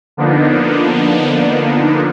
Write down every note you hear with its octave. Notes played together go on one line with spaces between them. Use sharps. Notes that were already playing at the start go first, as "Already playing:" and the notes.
D3 F3 A#3 B3 D4 D#4